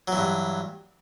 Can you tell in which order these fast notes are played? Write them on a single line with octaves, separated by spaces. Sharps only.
F#3 E3 G2